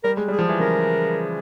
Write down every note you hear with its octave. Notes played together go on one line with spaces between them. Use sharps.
G3 A#4
G#3
G3 G#4
F3
E3
C#3 A#4